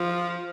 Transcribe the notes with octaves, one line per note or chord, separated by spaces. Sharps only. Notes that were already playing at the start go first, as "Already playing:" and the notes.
Already playing: F3